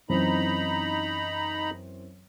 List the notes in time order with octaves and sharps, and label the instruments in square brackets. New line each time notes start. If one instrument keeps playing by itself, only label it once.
[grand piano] F#2 E3 C4 [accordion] D#4 A#5 B5